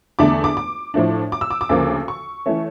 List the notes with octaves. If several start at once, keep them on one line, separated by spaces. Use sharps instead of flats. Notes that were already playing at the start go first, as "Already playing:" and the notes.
E2 D3 A3 D4 D6
D6
D6
A2 F3 A3 D4
D6
E6
D6
D6
D2 C#3 F3 A#3
C#6
E3 A3 C#4